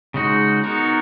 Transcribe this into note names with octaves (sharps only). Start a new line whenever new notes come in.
C#3 G#3 D#4 F#4
B3 D#4 F#4 A#4